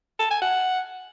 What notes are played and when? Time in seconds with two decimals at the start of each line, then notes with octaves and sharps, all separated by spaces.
0.20 A5
0.31 G#5
0.42 F#5